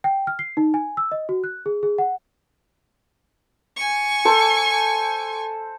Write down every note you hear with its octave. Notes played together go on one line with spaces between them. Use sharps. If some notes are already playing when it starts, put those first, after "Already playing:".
G5
F6
C7
D#4
G#5
E6
D#5
F#4
F#6
G#4
G#4
F#5
G#5 C#6
A4 C5